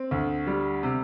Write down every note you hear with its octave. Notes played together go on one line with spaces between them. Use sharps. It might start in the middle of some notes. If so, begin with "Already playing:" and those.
Already playing: C4
D2
G3
C3